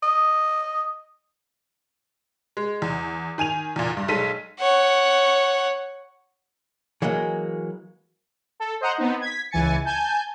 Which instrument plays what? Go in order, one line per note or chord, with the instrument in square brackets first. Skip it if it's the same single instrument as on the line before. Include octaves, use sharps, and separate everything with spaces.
[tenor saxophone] D#5
[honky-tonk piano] G#3
E2
D#3 G#5 D#7 F7
E2 A#2
G2
B1 G#3 A4 B6 D#7
[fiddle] C#5 F#5
[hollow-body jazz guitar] E3 F#3 G#3 A#3
[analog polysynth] A4
C5 D#5 F#5 A#5
B3 C4 D#4
G#6 B6
C#2 E3 G#5 A6 C#7
G#5 A5 G6